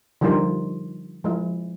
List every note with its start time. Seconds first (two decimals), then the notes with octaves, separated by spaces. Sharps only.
0.21 D3 F3 G3 D#4 F4 A#4
1.24 F3 G#3 E4